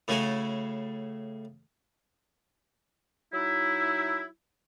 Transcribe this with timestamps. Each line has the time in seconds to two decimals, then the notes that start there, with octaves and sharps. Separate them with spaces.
0.08 A2 C#3 A3 F#4 G#5
3.33 F#3 D#4 E4